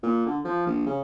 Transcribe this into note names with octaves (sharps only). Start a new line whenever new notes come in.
A#2
D3
F3
A#1
C#3